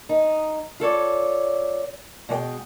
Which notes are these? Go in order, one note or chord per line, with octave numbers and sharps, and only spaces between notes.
D#4
F4 A4 C#5 D5
B2 G#3 C#5 G5